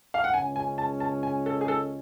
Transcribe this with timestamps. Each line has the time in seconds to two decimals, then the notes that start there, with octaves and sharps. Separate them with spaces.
0.14 F5
0.24 F#5
0.33 C#2 C#3 G#3 C#4 G#5
0.56 G#5
0.78 A5
1.00 A5
1.23 G#5
1.46 A4
1.61 G#4
1.68 A4